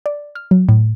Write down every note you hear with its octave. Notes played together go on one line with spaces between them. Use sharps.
D5
F6
F#3
A2